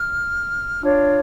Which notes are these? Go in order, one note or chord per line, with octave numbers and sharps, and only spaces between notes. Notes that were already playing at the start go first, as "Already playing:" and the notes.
Already playing: F6
D4 F4 C#5